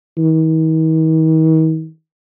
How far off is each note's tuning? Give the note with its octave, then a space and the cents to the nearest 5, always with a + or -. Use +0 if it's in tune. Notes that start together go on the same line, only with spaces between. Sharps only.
D#3 +45